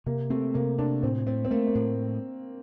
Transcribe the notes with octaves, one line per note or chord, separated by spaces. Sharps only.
C3 A#3
A3 C4
C3 A#3
C3 D4
A2 C4
A3 C4
C4
A3 A#3
A#3
A2